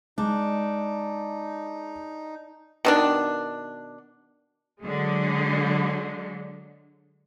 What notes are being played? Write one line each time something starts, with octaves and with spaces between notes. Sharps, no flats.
G#3 D4 D#4
B2 D#3 D4
D3 F#3 G#3